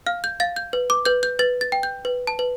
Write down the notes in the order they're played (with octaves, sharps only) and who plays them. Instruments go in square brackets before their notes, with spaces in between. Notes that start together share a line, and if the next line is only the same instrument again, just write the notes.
[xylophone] F5 F6
G6
F5 A6
G6
B4
D6
B4 G6
G6
B4 A6
A6
G5
G6
B4
A5
B4